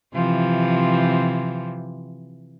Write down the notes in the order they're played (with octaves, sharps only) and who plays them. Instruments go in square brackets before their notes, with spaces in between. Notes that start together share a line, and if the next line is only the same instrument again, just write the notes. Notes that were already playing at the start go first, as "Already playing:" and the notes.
[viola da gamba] C3 E3 F3